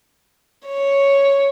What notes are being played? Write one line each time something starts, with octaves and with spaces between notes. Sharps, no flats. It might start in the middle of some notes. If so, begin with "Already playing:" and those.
C#5